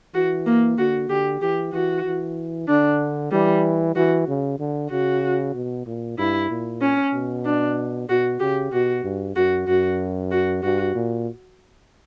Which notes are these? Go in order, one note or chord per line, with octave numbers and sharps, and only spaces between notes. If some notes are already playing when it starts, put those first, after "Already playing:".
E3 F#4
A#3
D3 F#4
D3 G4
E3 G4
E3 F#4
E3
D3 D4
E3 G3
E3 F#4
C#3
D3
C#3 F#4
B2
A#2
G2 E4
A#2
C#4
B2
D4
B2 F#4
C#3 G4
B2 F#4
G2
F#2 F#4
F#2 F#4
F#4
G2 F#4
A#2